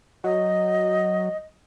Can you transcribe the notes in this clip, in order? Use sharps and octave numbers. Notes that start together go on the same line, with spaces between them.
F#3 D#5